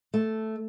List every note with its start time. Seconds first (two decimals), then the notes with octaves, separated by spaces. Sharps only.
0.14 A3